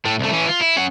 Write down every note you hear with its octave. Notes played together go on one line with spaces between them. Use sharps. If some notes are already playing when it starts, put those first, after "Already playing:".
A2 A3
C2 A3
E3 C#4
F4
E4
C#4 F#5